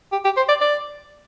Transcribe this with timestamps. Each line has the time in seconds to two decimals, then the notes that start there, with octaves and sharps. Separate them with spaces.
0.12 G4
0.25 G4
0.37 C5
0.49 D5
0.61 D5